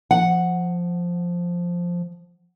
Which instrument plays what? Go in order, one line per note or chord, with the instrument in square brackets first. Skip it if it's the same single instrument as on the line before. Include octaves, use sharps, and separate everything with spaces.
[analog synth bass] F3 [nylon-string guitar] F#5